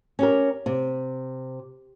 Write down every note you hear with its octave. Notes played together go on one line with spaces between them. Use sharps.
C#4 G4 A#4
C3